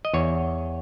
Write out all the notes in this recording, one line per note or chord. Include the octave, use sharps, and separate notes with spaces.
D#5
E2 C#5